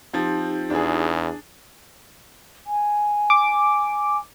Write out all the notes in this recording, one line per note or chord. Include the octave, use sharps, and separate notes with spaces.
F3 C4 D#4 F4 G4
E2 D4 G#4
G#5
D6